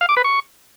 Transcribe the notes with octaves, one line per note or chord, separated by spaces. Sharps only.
F5
D6
B4
C#6